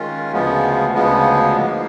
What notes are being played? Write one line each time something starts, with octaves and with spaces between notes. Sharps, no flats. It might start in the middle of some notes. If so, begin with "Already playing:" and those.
Already playing: D#3 G#3 C#4 F4
D2 C#3 F3 G#3 B3
D2 C#3 F3 G#3 B3
G#2 F3 A#3